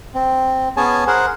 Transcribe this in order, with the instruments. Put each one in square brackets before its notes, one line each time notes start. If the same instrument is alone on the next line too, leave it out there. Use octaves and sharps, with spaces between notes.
[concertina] C4
B3 C#4 G#4 C#5 G#5 A5
G#4 A#4 C5 F#5